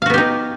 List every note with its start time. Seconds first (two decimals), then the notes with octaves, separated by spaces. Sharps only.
0.02 F5
0.06 F#4
0.10 B3
0.14 G4
0.18 D#4